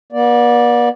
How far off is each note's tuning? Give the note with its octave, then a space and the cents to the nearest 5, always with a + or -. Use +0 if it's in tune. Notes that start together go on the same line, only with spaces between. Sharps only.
B3 -45 D5 +0